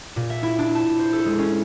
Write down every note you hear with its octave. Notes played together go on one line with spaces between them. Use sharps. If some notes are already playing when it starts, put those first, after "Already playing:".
A#2
E5
E4
D4
A5
C5
A4
G#3
C#4